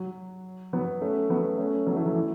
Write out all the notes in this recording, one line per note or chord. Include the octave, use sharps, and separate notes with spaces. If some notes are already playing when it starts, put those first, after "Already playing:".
Already playing: F#3
F#3 B3
A3 C#4
F#3 B3
A3 C#4
F#3 B3
E3 A3
F#3
E3